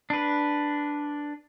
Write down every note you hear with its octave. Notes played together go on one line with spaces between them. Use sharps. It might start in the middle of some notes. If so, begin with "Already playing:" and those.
D4 B4